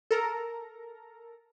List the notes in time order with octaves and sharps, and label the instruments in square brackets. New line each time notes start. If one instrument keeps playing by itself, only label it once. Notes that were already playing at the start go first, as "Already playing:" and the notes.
[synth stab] A4 A#4 A#5